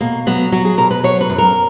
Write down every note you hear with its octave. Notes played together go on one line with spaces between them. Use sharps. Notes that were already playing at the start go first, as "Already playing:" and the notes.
B2 A#3
F#3 B3
F#3 F#4
G#4
B2 A#4
B4
F#3 C#5
B4
F#2
A#4